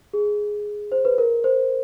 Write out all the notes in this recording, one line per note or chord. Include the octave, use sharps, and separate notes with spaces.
G#4
C5
B4
A#4
C5